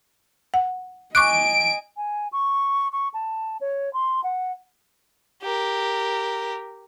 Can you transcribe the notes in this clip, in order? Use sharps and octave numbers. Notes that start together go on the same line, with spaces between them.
F#5
D#5 G#5 C#6 D6 F#6 D7
G#5
C#6
C#6
A5
C#5
C6
F#5
G4 A#4